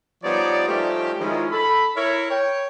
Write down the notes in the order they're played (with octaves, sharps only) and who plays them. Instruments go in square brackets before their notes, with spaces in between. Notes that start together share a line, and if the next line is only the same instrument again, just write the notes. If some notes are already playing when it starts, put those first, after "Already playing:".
[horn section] F3 G3 B3 D#4 C#5 D5
F3 G3 A3 C#4 D#4 G4
D#3 F3 G#3 C#4 E4 F4
A4 B5
E4 A#4 C#5
C#5 G5